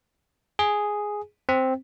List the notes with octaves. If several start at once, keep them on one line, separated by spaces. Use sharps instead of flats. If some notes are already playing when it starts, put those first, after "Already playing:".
G#4
C4